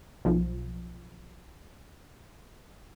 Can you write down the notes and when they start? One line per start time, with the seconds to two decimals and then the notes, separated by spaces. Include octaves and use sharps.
0.25 B1 F3